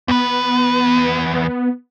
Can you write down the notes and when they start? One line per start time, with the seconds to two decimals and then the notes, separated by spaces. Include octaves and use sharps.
0.08 E2 B3 B4